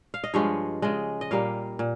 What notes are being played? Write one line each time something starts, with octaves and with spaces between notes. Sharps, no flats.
F5
D#5
G2 F3 G#3 C#5
C#3 G#3 D#5
D#5
A#2 G3 A#3 F5
A#2